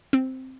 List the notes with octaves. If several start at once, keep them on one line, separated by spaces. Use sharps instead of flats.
C4